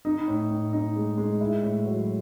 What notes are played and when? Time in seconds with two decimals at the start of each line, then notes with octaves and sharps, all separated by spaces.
0.05 D#4
0.28 A2
0.51 A2
0.73 D#4
0.96 G#3
1.18 G#3
1.41 E4
1.63 A2
1.85 F#3